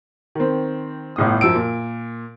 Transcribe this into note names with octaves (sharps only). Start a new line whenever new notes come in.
D#3 C4
G1 A2 D#6
F#2 F3 E6 D7
A#2